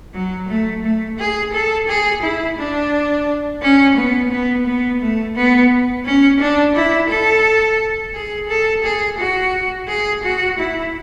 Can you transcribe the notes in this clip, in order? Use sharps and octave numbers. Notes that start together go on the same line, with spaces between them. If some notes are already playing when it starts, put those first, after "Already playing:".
F#3
A3
A3
G#4
A4
G#4
E4
D4
C#4
B3
B3
B3
A3
B3
C#4
D4
E4
A4
G#4
A4
G#4
F#4
G#4
F#4
E4